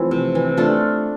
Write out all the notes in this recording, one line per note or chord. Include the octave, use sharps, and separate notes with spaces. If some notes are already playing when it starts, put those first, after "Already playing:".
Already playing: E3 F3 A3 C4 E4
C3
E3
A3 D4 F4